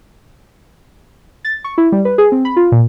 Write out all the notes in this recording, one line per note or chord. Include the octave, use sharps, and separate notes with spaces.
A6
C#6
E4
G3
B4
G#4
C4
B5
F4
A#2